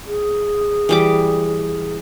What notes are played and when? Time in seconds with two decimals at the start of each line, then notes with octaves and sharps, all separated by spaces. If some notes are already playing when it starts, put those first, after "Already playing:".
0.06 G#4
0.89 E3 G3 D6